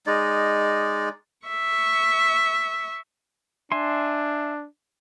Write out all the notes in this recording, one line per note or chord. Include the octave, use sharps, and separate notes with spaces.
G#3 D#4 D5
E5 C#6
D4 E5 G#5 C6